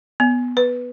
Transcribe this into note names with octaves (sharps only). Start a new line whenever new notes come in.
B3
B4